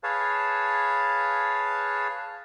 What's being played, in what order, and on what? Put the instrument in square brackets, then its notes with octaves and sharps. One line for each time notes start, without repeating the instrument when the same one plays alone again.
[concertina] G#4 B4 C#5 F5 A5